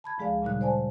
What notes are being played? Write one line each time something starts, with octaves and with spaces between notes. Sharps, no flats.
A5 B5 G#6
D2 F3 G#3 G#4 D5 F5
A#2 C#3 G3 D#4 F#6
C5 D5 G#5 A5